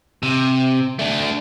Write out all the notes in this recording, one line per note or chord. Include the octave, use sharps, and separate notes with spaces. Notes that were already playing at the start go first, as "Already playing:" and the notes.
C3
A3 D4